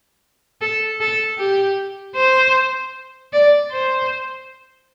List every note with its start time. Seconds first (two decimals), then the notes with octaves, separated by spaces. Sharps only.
0.61 A4
1.00 A4
1.38 G4
2.16 C5
3.33 D5
3.71 C5